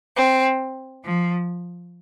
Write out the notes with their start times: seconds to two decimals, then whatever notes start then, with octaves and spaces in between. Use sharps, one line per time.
0.17 C4
1.05 F3